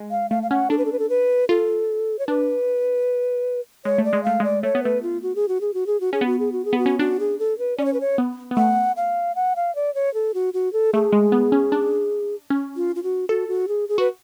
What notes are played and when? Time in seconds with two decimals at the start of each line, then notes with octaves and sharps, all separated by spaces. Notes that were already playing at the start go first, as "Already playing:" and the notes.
Already playing: G#3
0.11 F5
0.30 A3 F5
0.43 F5
0.50 C#4 F#5
0.70 D4 A4
0.78 B4
0.85 A4
0.92 B4
0.99 A4
1.10 B4
1.49 F4 A4
2.19 C#5
2.28 D4 B4
3.85 G#3 C#5
3.98 A3
4.05 D5
4.13 G#3
4.24 A3 F5
4.40 G#3 D5
4.63 A3 C#5
4.75 B3
4.83 A3 B4
5.03 F4
5.22 F#4
5.36 G#4
5.48 F#4
5.61 G#4
5.74 F#4
5.87 G#4
6.01 F#4
6.13 C#4 G#4
6.21 B3 F#4
6.39 G#4
6.52 F#4
6.65 G#4
6.73 B3
6.78 F#4
6.86 C#4
6.99 D4 F#4
7.20 G#4
7.39 A4
7.59 B4
7.78 C#4 D5
7.85 C#5
7.94 B4
8.01 C#5
8.18 B3
8.51 B3
8.57 A3 F#5
8.97 F5
9.36 F#5
9.56 F5
9.75 D5
9.95 C#5
10.14 A4
10.34 F#4
10.54 F#4
10.73 A4
10.93 A3 G#4
11.12 G#3
11.32 B3
11.52 C#4
11.72 D4
12.50 C#4
12.76 F4
12.96 F4
13.03 F#4
13.29 F#4 A4
13.48 F#4
13.68 G#4
13.89 G#4
13.98 F#4 B4